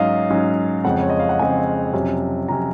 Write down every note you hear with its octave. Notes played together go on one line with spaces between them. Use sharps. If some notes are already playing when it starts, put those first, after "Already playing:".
Already playing: G#2 F#3 C#4 D#5 F5
G#2 F#3 C#4
F2 C#3 G#3 C4 F#5
C#5
D#5
F5
F#5
F2 C#3 G#3 C4 G#5
F2 C3 F#3 C#4
F2 C3 F#3 C#4 A#5